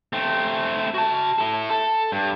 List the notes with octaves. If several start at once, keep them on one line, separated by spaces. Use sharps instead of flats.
A3 C4
F#4 A5
E4 A4
A4
G2